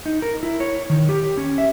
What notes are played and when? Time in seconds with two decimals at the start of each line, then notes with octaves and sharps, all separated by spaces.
0.06 D#4
0.22 A#4
0.43 E4
0.60 C#5
0.90 D#3
1.09 G4
1.37 C#4
1.58 E5